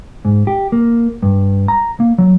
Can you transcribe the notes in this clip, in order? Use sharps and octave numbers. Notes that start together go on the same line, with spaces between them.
G#2
G4
A#3
G2
A#5
A#3
F#3